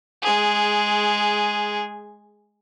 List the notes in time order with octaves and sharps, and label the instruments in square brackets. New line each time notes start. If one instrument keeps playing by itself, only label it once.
[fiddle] G#3 G#4